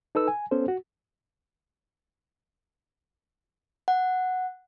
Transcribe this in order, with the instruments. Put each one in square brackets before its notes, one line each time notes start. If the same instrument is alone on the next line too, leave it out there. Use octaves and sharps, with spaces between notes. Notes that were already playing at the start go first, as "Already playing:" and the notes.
[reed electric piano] D#4 A4 B4 E6
G#5
B3 C#4 A4 C5
F#4
[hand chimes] F#5